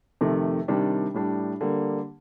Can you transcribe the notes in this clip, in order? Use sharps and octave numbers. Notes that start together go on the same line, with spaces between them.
F2 C3 D#3 A3
C3 D#3 G3 D4
A2 G3 D4
D3 G3 A#3